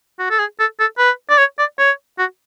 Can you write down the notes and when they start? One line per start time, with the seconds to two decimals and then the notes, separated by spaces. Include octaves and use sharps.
0.19 F#4
0.30 A4
0.39 G#4
0.59 A4
0.79 A4
0.98 B4
1.30 D5
1.38 C#5
1.58 D5
1.78 C#5
2.18 F#4